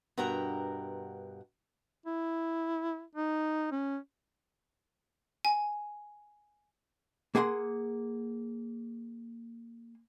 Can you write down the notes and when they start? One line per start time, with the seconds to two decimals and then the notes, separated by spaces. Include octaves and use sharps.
0.18 G2 B2 A#4 F#5 G5 A#5
2.06 E4
3.15 D#4
3.71 C#4
5.45 G#5
7.35 A#3 G#4 F#5 G5 C6